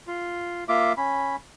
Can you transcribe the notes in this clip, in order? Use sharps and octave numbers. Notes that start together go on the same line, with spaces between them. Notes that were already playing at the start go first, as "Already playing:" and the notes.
F4
A#3 F4 E5 D6
C#4 B5